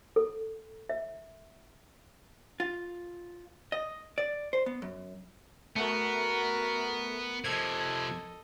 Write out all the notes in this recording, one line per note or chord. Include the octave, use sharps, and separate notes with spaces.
A4
E5
F4
D#5
D5
C5
B3
F#2
A3 B3 F#4 A#4
C3 F3 A4 D#5 G#6